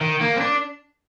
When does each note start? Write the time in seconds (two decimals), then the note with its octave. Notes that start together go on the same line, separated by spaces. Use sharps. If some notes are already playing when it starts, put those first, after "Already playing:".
0.01 D#3
0.21 A#3
0.36 C4
0.41 D4